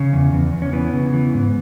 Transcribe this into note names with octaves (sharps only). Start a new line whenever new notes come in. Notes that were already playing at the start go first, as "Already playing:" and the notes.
Already playing: C#3 C#4
E2
E2
E2
C#4
E3 B3
C#3
E3
G#2